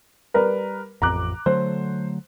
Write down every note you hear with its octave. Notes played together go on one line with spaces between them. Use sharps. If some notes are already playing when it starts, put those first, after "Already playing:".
G3 A#4 B4
A1 F2 A#5 D6 F#6
D3 F#3 A3 C5